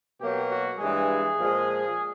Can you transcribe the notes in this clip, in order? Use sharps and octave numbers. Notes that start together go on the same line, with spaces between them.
B2 F#3 A#3 G4
F#4
G2 E3 G#3 G#4
A#2 F3 G#3